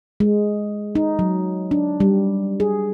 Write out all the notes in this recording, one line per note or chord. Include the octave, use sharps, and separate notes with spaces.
G#3
D#4
F#3
D4
G3
G#4